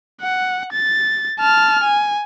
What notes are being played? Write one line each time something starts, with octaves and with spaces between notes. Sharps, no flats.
F#5
A6
A5 F6
G#5